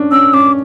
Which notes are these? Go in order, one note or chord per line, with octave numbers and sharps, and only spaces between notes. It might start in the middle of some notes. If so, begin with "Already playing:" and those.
Already playing: C#4 D4
C#4 E6
C#4 D6